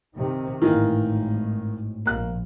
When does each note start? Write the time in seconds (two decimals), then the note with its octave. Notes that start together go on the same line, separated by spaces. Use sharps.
0.16 C3 D#3
0.62 G#1 A2 D#3 E3 A#3
2.06 A#1 A#3 F#6